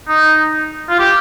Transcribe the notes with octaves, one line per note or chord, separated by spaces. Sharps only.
D#4
F4
G4